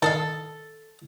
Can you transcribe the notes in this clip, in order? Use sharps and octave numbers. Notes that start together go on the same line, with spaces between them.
D#3 A4 D#5 F5